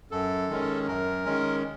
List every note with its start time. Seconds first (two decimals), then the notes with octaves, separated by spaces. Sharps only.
0.11 F#2 A4
0.49 D#3 G#3 C#4
0.87 F#2 A#4
1.25 D#3 G#3 C#4